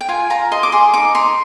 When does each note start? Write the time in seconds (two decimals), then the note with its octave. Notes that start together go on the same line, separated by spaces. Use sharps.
0.01 G5
0.09 F4 G#5
0.30 F4 A#5
0.52 D#5 C6
0.63 D6
0.72 G#4 C6
0.94 D#4 D6
1.15 D#4 C6